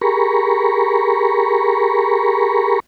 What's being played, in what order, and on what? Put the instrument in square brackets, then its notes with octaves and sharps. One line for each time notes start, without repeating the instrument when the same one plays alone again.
[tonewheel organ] G4 G#4 A#4 A#5 B5 C#6